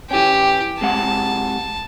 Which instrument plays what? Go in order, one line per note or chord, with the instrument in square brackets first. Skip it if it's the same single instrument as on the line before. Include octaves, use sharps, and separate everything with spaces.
[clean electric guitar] E3 C#4 [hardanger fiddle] G4
[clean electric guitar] C3 G#3 F#5 [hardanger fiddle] A5